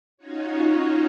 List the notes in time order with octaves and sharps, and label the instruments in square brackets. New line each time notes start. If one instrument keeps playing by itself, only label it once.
[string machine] C#4 D#4 F4 F#4 C#5